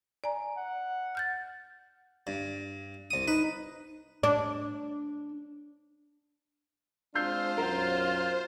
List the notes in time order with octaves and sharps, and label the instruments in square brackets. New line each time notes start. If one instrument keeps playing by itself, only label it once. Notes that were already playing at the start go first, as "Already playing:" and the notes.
[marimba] D5 G#5 A#5
[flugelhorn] F#5
[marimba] F6 G6 A6
[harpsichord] G2
C2 D#6
[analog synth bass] D#4 [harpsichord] B4
[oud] D4
[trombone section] G#3 C4 D4 [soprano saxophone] F4 [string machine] C5 [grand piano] E6 G6 C7
[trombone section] B1 F#2 [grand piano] A#4 F5 F#5